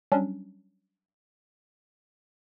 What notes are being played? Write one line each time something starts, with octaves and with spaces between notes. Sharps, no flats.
F#3 G3 C#4 D4